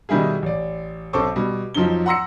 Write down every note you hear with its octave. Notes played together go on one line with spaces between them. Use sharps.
B2 D#3 G3 E4 G#4
A1 D5
B1 C4 A4 C5 C#6 D6
B2 G3
F2 F3 F#3 D#4 G7
F#5 A#5 C6 E6 A#6 C#7